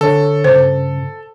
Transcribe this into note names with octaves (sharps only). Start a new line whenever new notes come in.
D3 A4 C#5
G2 C#3 C5